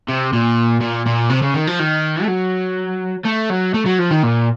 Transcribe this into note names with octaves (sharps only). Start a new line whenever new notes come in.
C3
A#2
A#2
A#2
C3
C#3
D#3
F3
D#3
A3
F#3
A3
F#3
A3
F#3
F3
D#3
A#2